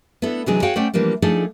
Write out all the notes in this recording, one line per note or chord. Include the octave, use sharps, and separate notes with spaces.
B3 D4 E4 A4
C3 E3 F#3 G#3 D4 G#4
F#4 G#4 C#5 F5 G5
A3 C#4 C5 D5 F#5 G5
E3 F3 G3 A#3 D4
F3 A3 D4 D#4 G#4 A4